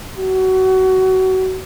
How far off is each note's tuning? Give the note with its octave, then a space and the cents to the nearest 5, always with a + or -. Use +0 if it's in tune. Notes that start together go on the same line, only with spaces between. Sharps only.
F#4 +25